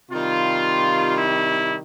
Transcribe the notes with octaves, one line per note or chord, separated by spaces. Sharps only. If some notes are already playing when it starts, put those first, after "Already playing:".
C3 D#3 G3 F4
E4